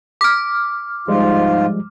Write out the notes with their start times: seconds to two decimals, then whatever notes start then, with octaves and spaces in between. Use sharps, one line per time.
0.21 D6 F6
1.08 G#2 F3 G3 G#3 F4